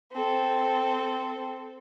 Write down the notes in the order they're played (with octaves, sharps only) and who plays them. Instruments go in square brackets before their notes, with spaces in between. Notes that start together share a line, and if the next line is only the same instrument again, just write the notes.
[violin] C4 A4